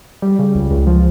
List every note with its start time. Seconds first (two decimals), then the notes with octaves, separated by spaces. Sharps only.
0.22 G3
0.39 C#3
0.55 C#2
0.71 C#2
0.87 F3